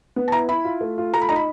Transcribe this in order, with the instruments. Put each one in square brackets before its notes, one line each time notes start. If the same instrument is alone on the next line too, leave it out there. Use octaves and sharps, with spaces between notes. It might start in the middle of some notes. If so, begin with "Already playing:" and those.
[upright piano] B3
[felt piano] A5
[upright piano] E4 [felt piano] A#5
[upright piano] E4 [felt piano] B5
[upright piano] F4
A3
F4
[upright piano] A3 [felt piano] A#5
[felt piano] B5
[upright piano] D#4 [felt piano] A#5
[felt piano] B5